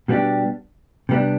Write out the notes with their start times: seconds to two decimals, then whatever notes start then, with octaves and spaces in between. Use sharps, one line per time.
0.08 B2 G3 B3 D4 G4
1.09 C3 G3 B3 D4